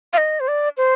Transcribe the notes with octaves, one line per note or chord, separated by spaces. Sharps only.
F5
D#5
C5
D5
C5